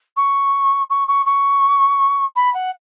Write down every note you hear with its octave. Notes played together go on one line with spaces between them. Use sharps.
C#6
C#6
C#6
C#6
B5
F#5